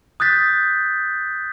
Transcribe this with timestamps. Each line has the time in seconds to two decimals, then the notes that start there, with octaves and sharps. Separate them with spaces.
0.20 D#6 F#6 G6 A6 B6